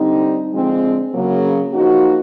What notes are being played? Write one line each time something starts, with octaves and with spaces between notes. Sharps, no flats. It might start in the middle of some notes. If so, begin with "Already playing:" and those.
Already playing: D3 G3 C4 D#4
D3 F3 G#3 C4
C#3 F#3 A#3
F3 A#3 D#4 F#4